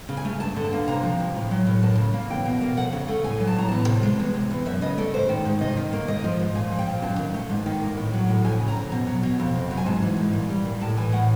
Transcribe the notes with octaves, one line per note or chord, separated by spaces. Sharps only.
C#3
G#5
A3
G2 A5
D3
A5
A#3
C3 A#5
F3
C3
A2
F#3
A2
F#2 A5
C#3
A#3
E2 G5
B2
A#3
F2 F#5
C#3
A3
A2 G#5
F#3
A5
A2 A#5
E2 A5
C3
G#3
E2
C3
E2
F#2 E5
C#3 D#5
A3 D5
G#2 C5
D#3
G#2
C3 D#5
D#3
A#3
G#2 D#5
F3
G#2
A#2 G#5
F3
G5
A#2
F#2 A5
D#3
A3
G#2
D#3
A#3
A2
F#3
A2
F2 G#5
C#3
A#5
F2
B2
F#3
B2
F2
C3
F#3
G#5
G#2 A5
E3
G#2
A#2
G3
A#2
A2 A5
E3 G#5
A2 F#5